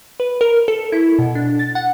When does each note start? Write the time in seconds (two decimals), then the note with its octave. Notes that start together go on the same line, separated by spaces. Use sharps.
0.20 B4
0.41 A#4
0.68 A4
0.92 E4
1.19 B2
1.35 D4
1.59 A6
1.75 F#5